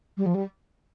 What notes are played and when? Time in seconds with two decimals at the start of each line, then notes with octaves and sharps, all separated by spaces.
0.17 G3
0.26 F3
0.34 G3